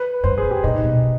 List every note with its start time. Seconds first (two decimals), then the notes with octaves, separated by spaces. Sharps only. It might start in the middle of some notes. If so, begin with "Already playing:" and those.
Already playing: B4
0.24 G2 C5
0.38 G#4
0.44 A2
0.51 G4
0.64 A#2 D#4
0.84 B2
1.03 B2